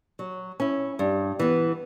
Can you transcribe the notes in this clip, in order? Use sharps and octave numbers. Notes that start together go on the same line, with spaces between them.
F#3
C#4 E4
G2
E3 B3